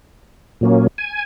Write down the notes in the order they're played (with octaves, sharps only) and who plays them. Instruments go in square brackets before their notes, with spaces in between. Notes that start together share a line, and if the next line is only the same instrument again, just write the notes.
[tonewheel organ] A#2 F#3 A#3 C#4
G#5